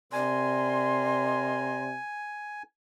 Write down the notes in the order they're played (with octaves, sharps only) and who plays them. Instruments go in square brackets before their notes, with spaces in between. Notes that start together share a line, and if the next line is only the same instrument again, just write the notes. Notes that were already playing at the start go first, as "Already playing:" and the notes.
[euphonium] C3 [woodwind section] A#4 A#5 C6 [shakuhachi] D5 [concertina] G#5